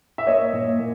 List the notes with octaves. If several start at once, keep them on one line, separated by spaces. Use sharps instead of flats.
E5
A#3 C#5 D#5
A#2
A#2